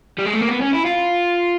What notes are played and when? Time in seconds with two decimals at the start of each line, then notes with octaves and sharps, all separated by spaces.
0.19 G3
0.26 G#3
0.34 A3
0.42 A#3
0.50 B3
0.62 C#4
0.74 E4
0.86 F4